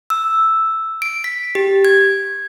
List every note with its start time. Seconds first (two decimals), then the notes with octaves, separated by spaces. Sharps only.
0.10 E6
1.02 D7
1.24 B6
1.55 G4
1.85 G#6